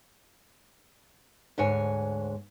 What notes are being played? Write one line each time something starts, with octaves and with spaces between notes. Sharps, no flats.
D2 G#2 C#5 G#5